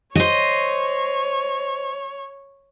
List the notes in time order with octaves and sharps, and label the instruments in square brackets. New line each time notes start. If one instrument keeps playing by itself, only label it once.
[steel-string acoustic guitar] C5 D#5 [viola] C#5